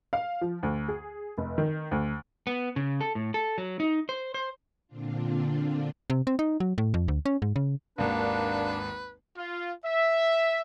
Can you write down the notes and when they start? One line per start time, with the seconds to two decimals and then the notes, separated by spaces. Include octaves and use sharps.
0.13 F5
0.41 F3
0.63 D2
0.88 G#4
1.38 F1
1.58 D#3
1.91 D2
2.47 B3
2.76 C#3
3.01 A4
3.15 A2
3.34 A4
3.58 F#3
3.80 D#4
4.09 C5
4.34 C5
4.87 A#2 D3 C4 D4 F4
6.10 C3
6.27 C4
6.39 D#4
6.60 F#3
6.78 A2
6.94 F2
7.08 D2
7.26 C#4
7.42 G#2
7.56 C#3
7.98 G#1 D#2 A#3 D4 B4
9.37 F4
9.85 E5